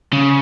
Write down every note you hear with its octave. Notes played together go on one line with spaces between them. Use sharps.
C#3